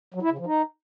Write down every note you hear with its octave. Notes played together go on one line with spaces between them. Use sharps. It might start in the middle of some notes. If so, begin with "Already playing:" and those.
F#3
E4
C#3
F3
D#4